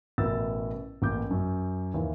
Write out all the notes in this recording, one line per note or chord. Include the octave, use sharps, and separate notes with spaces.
A1 B2 E4 A#4 E6 A6
A1 A#3 D6 G6
F#2
D#2 E3